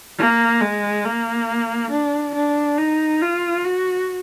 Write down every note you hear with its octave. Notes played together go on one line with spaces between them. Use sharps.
A#3
G#3
A#3
D4
D4
D#4
F4
F#4